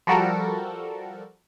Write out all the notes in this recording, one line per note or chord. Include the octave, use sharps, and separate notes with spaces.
F3 G3 F#4 A4 A#4